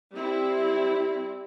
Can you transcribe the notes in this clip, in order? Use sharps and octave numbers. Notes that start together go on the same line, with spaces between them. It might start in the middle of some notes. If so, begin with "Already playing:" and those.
G3 C4 E4